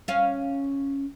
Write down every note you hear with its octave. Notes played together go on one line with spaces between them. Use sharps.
C#4 F5